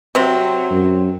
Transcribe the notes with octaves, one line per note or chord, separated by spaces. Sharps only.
C3 F#3 C4
F#2